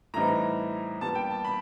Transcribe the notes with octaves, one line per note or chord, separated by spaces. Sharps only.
A2 E3 G3 C4 D#4 A#5
A#2 G3 B3 A5
G5
A5
B5